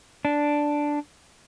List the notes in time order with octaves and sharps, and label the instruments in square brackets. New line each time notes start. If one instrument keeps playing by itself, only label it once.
[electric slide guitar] D4